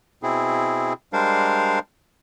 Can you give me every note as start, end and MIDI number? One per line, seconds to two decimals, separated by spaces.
0.23 0.93 47
0.23 0.93 60
0.23 0.93 64
0.23 0.93 68
1.13 1.79 55
1.13 1.79 56
1.13 1.79 62
1.13 1.79 70
1.13 1.79 72
1.13 1.79 77